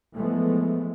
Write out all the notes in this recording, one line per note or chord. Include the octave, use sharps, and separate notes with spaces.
E3 F3 G#3 A3 B3